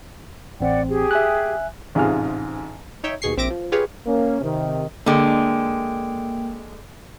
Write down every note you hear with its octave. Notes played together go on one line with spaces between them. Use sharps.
A1 C4 D5 F#5 G5
G4 G#4
E5 G#5 F#6
A1 G#2 C3 F4 G#4 F6
D#4 C#5 E5 G5
D#2 B2 G#4 C#6 C7
A#1 C4 E5 D6 A#6 D7
F3
F4 G4 G#4 B4 C#5 F5
A#3 C#4
C3 D#3
D3 G#3 A#3 G5 D7